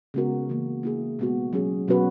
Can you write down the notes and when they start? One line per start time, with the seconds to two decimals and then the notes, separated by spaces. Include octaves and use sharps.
0.14 C#3 G#3 B3 F#4 A#4
0.49 C#3 E3 A#3
0.83 A#3 E4 G#4
1.19 B2 G#3 B3 F#4
1.53 F#3 C#4 G#4
1.88 B2 F#3 C#4 F#4 B4